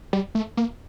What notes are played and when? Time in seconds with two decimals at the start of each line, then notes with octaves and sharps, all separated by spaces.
0.13 G3
0.35 A3
0.57 A#3